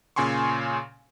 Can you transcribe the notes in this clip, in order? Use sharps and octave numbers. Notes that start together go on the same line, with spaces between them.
A#2 C#3 G#5 C6 C#6